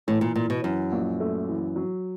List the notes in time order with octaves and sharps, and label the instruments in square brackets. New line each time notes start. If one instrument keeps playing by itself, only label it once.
[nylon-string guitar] A2 [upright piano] E3
[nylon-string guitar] A#2
[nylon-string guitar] A#2 [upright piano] E3
[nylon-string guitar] B2
[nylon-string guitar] F#2 [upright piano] E3
[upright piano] A#1
A3
E3
F#3